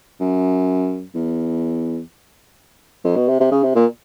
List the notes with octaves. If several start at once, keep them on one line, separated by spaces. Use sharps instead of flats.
F#2
E2
F2
B2
C3
C3
C#3
C3
A#2